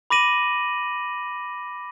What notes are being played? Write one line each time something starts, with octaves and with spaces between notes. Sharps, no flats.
B5 D6 A#6 D#7 F#7